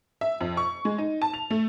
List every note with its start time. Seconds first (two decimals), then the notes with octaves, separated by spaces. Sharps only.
0.21 E5
0.41 F2
0.57 C#6
0.85 G#3
0.98 D#4
1.22 A5
1.34 F7
1.51 A3